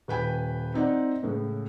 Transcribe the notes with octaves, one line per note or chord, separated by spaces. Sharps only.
D#1 B4 G5 G#5 B5
C4 D#4 D5 F#5
C#2 A2 C#3